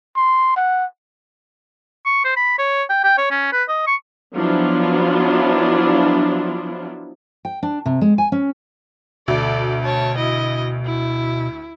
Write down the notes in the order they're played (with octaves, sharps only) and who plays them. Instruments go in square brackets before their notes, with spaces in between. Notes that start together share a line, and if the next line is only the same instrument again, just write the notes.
[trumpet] C6
F#5
[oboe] C#6
C5
B5
C#5
G5
G5
C#5
C#4
B4
D#5
C#6
[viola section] F3 F#3 B3 D4 E4 F4
[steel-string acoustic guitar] G5
D4
C3
G#3
G#5
C#4
[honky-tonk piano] D2 [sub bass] B2 [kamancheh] A4 D5
[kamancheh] C#5 A5
E4 D#5
E4